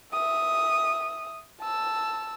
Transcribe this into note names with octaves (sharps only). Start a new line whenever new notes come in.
E5 D#6
A5 E6